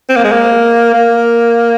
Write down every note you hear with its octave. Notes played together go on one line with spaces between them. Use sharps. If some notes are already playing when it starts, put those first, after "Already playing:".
C4
A#3
G#3
A#3
A#3